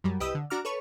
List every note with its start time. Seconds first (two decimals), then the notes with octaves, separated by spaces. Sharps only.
0.04 F#2 F#3 G3
0.20 C2 G4 B4 D#5 D#6 E6
0.35 D3
0.50 D4 F#4 A#5 D6 F6
0.65 A4 B4 C#5 C#6